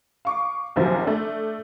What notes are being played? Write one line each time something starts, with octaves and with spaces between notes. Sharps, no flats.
F5 C#6 D6
A#1 F#2 C3 D#3 F3 F#3
A3 D4